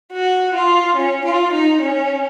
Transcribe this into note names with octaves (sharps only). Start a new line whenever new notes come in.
F#4
F4
C#4
F4
D#4
C#4